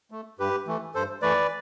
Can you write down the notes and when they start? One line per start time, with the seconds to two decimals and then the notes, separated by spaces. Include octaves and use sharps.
0.11 A3
0.39 G2 G4 B4
0.66 E3 A3
0.94 G2 A4 C5
1.22 E3 A3 B4 D5